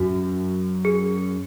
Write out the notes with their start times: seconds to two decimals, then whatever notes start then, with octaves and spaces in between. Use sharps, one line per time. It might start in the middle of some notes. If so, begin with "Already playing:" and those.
Already playing: F#2 F#4
0.85 G#4